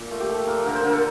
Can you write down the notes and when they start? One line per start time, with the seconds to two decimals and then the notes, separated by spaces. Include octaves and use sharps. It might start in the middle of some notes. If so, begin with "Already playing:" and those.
Already playing: A#2
0.11 A3 F4
0.20 G4
0.29 F3 A4
0.47 A#2 A#4
0.65 D3 A#4
0.74 C5
0.83 D3 A#4
0.93 A4